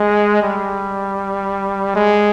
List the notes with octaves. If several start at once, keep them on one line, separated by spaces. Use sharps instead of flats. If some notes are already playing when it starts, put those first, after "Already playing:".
Already playing: G#3
G3
G#3